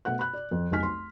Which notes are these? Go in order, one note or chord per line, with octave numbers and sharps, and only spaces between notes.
B2 A3 F#5 F#6
B5 F#6
D5
F2
F1 B1 D#4 G#5 F6 B6
C6